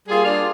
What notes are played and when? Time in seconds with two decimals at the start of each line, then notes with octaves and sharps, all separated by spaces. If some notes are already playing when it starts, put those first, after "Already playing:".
0.08 G3 A#3 F4 G#4
0.24 D4 F4